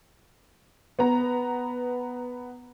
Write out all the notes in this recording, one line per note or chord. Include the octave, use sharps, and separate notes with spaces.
B3 A#5